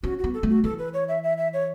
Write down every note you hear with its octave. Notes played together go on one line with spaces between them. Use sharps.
C#4 F#4
F#4
B3
A4
A3
F#4
E3 A4
B4
C#5
E5
E5
E5
C#5